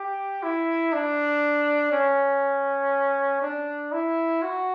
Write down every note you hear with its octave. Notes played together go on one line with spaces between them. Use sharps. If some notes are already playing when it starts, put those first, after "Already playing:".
Already playing: G4
E4
D4
C#4
D4
E4
F#4